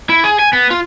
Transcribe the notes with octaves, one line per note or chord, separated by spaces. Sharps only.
E4
G#4
G#5
B3
F4